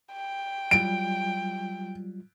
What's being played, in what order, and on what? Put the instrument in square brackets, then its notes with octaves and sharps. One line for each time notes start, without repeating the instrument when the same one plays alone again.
[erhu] G5
[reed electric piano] F#3 G3 F4 [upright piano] D7